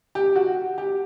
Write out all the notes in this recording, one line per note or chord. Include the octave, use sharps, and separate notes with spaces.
G4
F#4
G4